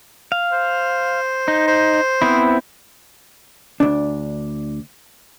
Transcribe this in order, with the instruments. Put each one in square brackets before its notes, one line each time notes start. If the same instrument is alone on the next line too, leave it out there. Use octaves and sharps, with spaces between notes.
[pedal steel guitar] F5
[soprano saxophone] C5
[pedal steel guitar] D#4
[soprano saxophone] C5
[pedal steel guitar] B3 C4 E4
[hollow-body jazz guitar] D2 D4